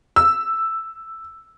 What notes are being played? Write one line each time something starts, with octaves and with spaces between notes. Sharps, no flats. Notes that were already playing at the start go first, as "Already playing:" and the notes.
E6